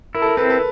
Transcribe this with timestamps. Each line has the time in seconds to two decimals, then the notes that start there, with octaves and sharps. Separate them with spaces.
0.15 E4 A#4
0.22 A4
0.26 A#4
0.37 C4 A4 B4
0.50 A4 B4